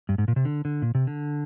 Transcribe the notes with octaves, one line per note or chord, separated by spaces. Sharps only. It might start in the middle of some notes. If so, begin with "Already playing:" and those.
G2
G#2
A#2
C3
D3
D3
A#2
C3
D3